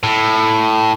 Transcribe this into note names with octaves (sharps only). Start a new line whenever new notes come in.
A2